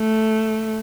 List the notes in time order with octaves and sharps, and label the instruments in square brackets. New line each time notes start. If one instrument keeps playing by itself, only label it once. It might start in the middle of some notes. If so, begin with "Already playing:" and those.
Already playing: [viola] A3